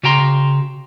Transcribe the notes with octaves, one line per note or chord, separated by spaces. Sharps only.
C#3 F#4 G5 A#5 C6